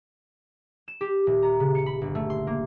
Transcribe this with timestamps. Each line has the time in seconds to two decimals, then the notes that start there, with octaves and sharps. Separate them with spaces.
0.88 E7
1.01 G4
1.27 D#1
1.43 A#5
1.60 C#3
1.75 C#7
1.86 B5
2.01 G1
2.15 A3
2.30 C6
2.47 A#3